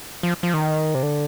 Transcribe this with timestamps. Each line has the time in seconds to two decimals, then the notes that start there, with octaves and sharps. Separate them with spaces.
0.23 F3
0.43 F3
0.54 D#3
0.95 C3
1.03 D3